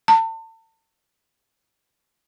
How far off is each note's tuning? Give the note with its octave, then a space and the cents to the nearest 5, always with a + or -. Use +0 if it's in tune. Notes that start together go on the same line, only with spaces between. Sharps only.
A5 +35